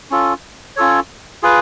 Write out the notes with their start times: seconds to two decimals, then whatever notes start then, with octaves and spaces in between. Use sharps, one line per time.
0.11 C#4 F4 A4
0.76 C#4 F4 A4 C#5
1.43 F4 G#4 B4